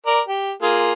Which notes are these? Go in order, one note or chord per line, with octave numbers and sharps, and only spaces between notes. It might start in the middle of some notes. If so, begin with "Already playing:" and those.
A#4 D5
G4
A#3 F4 G#4